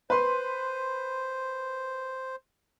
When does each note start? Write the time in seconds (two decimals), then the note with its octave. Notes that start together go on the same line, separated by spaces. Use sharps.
0.10 B4 C5 C6